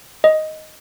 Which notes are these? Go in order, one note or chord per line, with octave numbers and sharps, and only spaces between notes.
D#5